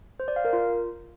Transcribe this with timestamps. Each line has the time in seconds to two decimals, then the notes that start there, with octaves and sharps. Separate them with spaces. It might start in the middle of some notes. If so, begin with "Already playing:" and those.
0.20 C5
0.28 D5
0.36 F5
0.45 A#4
0.53 F4